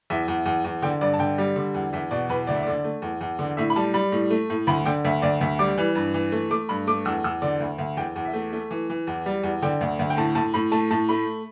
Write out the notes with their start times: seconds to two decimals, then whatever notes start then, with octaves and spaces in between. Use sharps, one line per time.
0.10 E2 E5
0.28 E2
0.46 E2
0.65 E2
0.82 D3 G5
1.01 G2 D5
1.14 A5
1.19 D3 G5
1.38 G3
1.56 D3
1.74 E2
1.93 E2 E5
2.11 B2 D5
2.29 E2 B4
2.47 D2 D5
2.56 E5
2.63 D3 D5
2.84 A3
3.02 E2
3.21 E2
3.39 D3
3.57 A2 E5
3.70 B5
3.76 G3 A5
3.94 G3 B5
4.12 A2
4.30 A3
4.50 A2
4.67 D2 B5
4.86 D3 G5
5.05 D2 E5
5.22 D2 D5
5.41 D2 E5
5.59 G3 D6
5.78 E3
5.95 G2
6.14 E3
6.32 A3
6.51 A3 D6
6.69 G2 B5
6.87 A3 D6
7.05 E2 E6
7.24 E2 E6
7.42 D3 D5
7.60 D2
7.78 D2
7.97 E2 G5
8.16 E2
8.25 E5
8.33 A3
8.53 A3
8.71 E3
8.90 E3
9.07 E2
9.26 G3
9.43 E2
9.62 D3 G5
9.81 D2
9.99 D2
10.10 G5
10.17 A2 A5
10.35 A2 A5
10.54 A2 B5
10.72 A3 A5
10.91 A2 A5
11.09 A3 B5